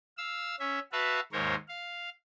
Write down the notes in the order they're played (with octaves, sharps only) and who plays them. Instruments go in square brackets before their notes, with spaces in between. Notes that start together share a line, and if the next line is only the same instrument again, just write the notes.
[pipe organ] F5 E6
C#4 E5
F#4 B4 E5 F5 A5
D#2 G#2 A#4 C5 C#5
F5